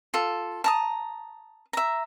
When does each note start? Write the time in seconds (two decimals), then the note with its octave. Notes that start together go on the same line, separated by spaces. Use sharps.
0.14 F4 A4
0.64 A5 A#5 D#6
1.73 E5 A#5